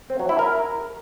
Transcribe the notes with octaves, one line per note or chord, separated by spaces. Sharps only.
C4
F#3
E4
A#4